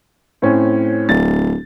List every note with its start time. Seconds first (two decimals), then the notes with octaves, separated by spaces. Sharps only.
0.42 A2 C4 C#4
1.09 D1 A6